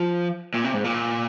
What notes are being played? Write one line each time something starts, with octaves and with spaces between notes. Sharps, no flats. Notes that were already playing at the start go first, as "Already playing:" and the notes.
Already playing: F3
A#2
C3
G#2
A#2